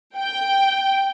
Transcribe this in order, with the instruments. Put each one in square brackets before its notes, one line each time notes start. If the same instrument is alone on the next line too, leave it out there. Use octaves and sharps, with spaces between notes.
[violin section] G5